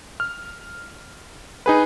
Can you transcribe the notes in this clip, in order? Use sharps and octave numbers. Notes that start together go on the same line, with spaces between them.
F6
D#4 G#4 B4